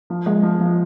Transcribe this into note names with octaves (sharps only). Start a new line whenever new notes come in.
F3
G#3
F3
F3